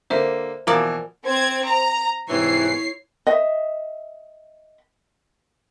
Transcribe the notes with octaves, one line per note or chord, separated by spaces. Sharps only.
D3 A#3 C5 E5
B2 E3 F3 A#3 A#4 D5
C4 G#6
A#5
G#2 C3 E3 E4 C#5 C7
D#5 E5